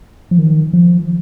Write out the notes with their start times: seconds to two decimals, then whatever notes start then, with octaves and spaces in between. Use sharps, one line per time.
0.31 F3
0.39 D#3
0.73 F3